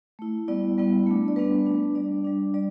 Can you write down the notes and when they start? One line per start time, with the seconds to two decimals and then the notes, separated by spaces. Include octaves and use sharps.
0.19 A3 E4
0.48 G3 B3 E4 D5
0.78 G3 B3 E4
1.07 A3 D4
1.28 D5
1.36 G3 B3 D4 B4
1.66 A3 D4
1.95 G3 D4 D5
2.24 G3 D4
2.54 G3 D5